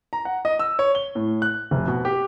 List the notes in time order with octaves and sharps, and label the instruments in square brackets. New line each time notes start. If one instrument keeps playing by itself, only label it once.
[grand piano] A#5
F#5
D#5
E6
C#5
G7
A2
F#6
F1
B2
G4